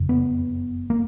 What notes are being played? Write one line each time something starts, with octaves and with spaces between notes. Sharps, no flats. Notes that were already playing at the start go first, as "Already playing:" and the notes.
Already playing: F#1 F2 C#3
B3
A#3